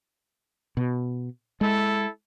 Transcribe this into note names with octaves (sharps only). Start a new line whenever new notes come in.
B2
G#3 E4 A4